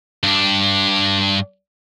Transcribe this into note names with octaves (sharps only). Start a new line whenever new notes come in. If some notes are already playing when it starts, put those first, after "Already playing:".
G2 D4